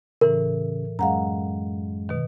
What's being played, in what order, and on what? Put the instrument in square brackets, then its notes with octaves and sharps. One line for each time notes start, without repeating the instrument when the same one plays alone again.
[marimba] A2 E3 [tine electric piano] C#3 [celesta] A#4
[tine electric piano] F#2 G#3 [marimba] F5 F#5 A#5
[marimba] B2 D#3